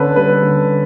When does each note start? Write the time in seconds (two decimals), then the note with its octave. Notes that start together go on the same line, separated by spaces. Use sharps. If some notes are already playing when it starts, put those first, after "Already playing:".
Already playing: D3 C#4 A4 B4
0.16 G3 B4
0.43 D3